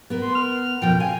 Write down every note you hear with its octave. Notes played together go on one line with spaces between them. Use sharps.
B3 A#4
C6
F6
F2 B2 F3 G5
F5 G#5